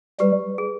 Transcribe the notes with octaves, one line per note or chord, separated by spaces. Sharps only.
G3 G4 B4
G#4